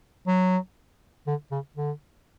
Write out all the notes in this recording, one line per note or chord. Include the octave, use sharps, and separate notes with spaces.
F#3
D3
C#3
D3